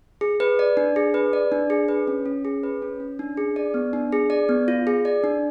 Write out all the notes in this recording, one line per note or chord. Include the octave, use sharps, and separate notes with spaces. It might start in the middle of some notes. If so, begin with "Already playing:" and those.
G#4
B4
D5
D4
G#4
B4
D5
D4
G#4
B4
C#4
C#4
G#4
B4
C#4
C#4
D4
G#4
D5
B3
D4
G#4
D5
B3
F4
G#4
D5
D4